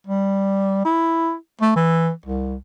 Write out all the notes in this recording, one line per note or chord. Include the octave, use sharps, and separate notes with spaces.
G3
E4
A3
E3
C2